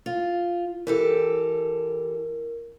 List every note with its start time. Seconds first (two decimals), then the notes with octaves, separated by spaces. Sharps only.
0.06 F4
0.87 E3 G4 A4 A#4